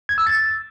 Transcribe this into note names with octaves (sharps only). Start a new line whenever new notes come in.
G#6
E6
A6